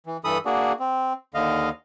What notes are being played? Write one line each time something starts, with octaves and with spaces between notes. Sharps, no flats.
E3
G2 E3 A4 B5 D#6
A#3 D4 F#4 G#4
C4
D#2 D3 D#5 F5